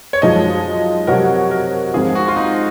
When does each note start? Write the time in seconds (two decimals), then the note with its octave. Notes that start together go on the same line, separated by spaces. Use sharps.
0.13 C#5
0.22 F#2 F3 G#3 D#4 D#5
1.07 C3 F#3 C4 F#4 A#4 C#5
1.51 A#4
1.94 G#2 F3 C4 F4 G#4
2.15 F#4
2.28 F4
2.36 D#4